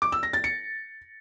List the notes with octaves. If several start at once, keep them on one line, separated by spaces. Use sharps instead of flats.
D6
E6
A#6
A6
C#7